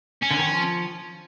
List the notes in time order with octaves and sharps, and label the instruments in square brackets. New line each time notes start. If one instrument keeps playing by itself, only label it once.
[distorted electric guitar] C#4
[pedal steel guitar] D3
D#3
F3